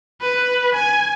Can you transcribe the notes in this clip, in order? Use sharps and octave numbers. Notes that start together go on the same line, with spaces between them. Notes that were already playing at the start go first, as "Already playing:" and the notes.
B4
G#5